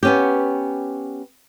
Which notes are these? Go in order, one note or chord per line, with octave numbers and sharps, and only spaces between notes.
B3 C#4 G4